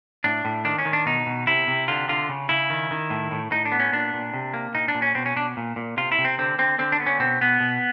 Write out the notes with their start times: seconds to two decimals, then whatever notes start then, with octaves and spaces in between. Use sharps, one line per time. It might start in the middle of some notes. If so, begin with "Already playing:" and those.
0.24 A2 D4
0.45 A2
0.65 D#3 D4
0.79 C#4
0.85 D#3
0.93 D4
1.06 B2 D#4
1.26 B2
1.47 C3 E4
1.68 C3
1.88 D3 F4
2.08 D3 F4
2.29 C#3
2.49 C#3 E4
2.70 D#3
2.91 D#3
3.10 A2
3.31 A2
3.51 A2 D#4
3.65 D4
3.72 B3
3.80 C#4
3.92 A#2 D4
4.14 A#2
4.34 C3
4.54 A#3
4.74 A#2 D#4
4.88 D4
4.95 A#2
5.02 C#4
5.15 B2 C4
5.26 C#4
5.36 B2 D4
5.57 A#2
5.76 A#2
5.97 C3 F4
6.12 E4
6.18 C3
6.25 C4
6.38 D3 C4
6.58 D3 C4
6.79 D3 C4
6.92 D4
7.00 B3
7.06 C#4
7.19 B2 C4
7.41 B2 B3
7.61 B2